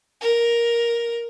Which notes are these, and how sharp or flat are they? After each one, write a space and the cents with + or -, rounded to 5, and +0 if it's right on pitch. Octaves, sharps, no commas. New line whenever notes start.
A#4 +10